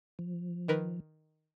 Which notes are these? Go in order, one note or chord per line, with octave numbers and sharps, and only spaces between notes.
F3
D#3 A#4 B4